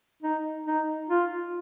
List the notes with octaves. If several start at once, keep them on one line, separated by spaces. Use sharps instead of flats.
D#4
D#4
F4